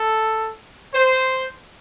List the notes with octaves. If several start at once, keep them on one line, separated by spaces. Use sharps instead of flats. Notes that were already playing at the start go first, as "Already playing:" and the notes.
Already playing: A4
C5